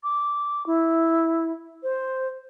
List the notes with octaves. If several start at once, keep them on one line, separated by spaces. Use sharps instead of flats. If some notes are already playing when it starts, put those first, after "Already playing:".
D6
E4
C5